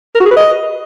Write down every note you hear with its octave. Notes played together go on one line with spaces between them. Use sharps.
A#4
F#4
G#4
B4
D#5